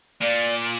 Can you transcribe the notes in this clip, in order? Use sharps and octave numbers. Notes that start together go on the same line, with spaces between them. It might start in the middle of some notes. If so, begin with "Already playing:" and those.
A#2 D5